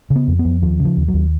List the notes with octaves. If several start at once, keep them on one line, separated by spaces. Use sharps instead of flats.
C#3
B3
F2
B3
F2
D#2 F3
C#3
F3
D#2
F#3
D#2